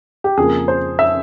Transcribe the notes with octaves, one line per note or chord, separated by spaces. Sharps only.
G4
F2 C#3 F3 A#3 G#4
C5
E5